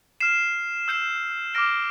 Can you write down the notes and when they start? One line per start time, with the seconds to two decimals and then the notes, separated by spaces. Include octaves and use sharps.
0.20 F6 C7 E7
0.88 E6 G6 C7 E7
1.54 D6 F6 A#6 D7 G7